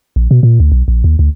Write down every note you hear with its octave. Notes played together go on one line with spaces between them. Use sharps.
A#1
B2
A#2
D2
B1
A#1
D#2
D2